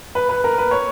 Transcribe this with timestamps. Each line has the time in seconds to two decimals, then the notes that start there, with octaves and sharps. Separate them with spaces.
0.15 B4
0.29 B4
0.44 A#4
0.58 B4
0.71 C#5